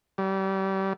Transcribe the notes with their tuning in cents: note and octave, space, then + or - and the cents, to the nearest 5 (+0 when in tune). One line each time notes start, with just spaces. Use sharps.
G3 -30